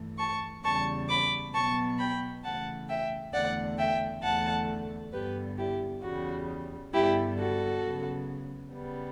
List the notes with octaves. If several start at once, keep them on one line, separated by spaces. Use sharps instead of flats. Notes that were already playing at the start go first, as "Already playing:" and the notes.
Already playing: G2 E3 A3
A5 C#6
E2 C#3 G3 A5 C#6
B5 D6
B2 F#3 B3 A5 C#6
G5 B5
C#3 E3 A3 F#5 A5
E5 G5
E2 D3 A3 D5 F#5
E5 G5
E2 D3 A3 F#5 A5
G2 D3 G3 B3 G4 B4
E4 G4
E2 C#3 G3 F#4
G2 D3 G3 B3 E4 G4
F#4 A4
C#3 F#3 B3
C#3 G3 B3